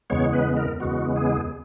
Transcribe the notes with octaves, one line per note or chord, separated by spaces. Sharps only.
E2 C#3 G#3 B3 C#5
B4
A#4
E2 C#3 G#3 B3 F#4
G#4